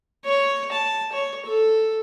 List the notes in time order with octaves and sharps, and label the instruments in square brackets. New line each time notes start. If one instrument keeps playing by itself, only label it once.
[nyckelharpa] C#5
A5
C#5
A4